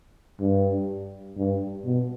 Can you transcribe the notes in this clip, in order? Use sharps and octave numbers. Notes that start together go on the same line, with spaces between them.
G2
G2
B2